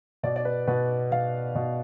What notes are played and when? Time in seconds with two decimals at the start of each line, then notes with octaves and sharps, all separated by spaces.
0.23 B2 D5
0.36 D5
0.45 B4
0.67 B2 B4
1.12 B2 F5
1.55 B2